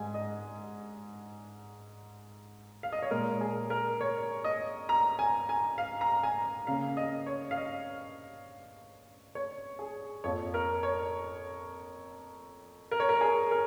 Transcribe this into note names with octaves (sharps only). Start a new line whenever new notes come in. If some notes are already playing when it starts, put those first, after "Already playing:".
Already playing: G#2 G#3 G#5
D#5
F5
D#5
C#5
A#2 G#3 A#4
G#4
A#4
C#5
D#5
A#5
G#5
G#5
F5
A#5
G#5
C#3 A#3 F5
D#5
C#5
F5
D#5
C#5
G#4
F2 F3 A#3 C#5
A#4
C#5
A#4
C#5
A#4
G#4
A#4